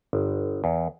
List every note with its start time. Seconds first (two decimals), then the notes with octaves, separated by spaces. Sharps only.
0.13 G1
0.64 E2